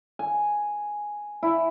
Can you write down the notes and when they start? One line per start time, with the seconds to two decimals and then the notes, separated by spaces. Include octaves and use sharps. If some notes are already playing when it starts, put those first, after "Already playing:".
0.19 G#5
1.43 E4